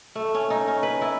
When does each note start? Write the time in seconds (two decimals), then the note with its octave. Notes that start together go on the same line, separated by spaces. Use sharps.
0.15 A3
0.35 C#4
0.50 D#4
0.68 C#4
0.83 B4
1.01 E4